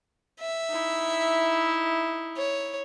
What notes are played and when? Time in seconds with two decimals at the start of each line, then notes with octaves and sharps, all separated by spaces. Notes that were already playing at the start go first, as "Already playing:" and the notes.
0.40 E5
0.70 D#4 E4
2.37 C#5